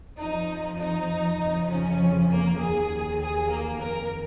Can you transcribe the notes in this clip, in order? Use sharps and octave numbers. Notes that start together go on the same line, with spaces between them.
F2 F3 D#4
D#4
F2 C#3 F3
C#4
A#3
D#2 D#3 G#4
G#4
A#3
F2 D#3 A#4